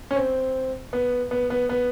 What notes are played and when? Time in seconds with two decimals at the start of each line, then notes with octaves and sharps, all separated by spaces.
0.11 C#4
0.16 C4
0.93 B3
1.31 B3
1.50 B3
1.69 B3